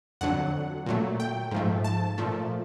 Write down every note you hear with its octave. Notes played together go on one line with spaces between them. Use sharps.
F2 D3 F#3 F#5
A#2 F#3 A3
G5
G#2 F3 A3
A5
A#2 F3 A3